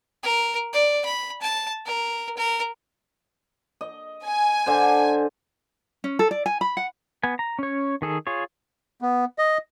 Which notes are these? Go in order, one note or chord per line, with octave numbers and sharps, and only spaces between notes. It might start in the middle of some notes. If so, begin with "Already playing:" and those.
A#4
D5
B5
A5
A#4
A#4
D#5
G#5
D3 C5
C#4
A4
D5
G#5
B5
F#5
B3 G#5
A#5
C#4 C#5
D#3 G#4 A4
F4 G#4 C#5
B3
D#5